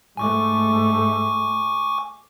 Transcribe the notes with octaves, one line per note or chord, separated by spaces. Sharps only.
G#2 A3 G#5 C#6 D6